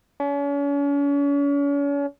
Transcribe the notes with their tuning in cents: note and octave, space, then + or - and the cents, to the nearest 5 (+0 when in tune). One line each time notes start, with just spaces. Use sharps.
C#4 +40